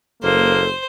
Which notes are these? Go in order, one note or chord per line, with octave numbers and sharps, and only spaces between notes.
F#1 A#3 A4 C5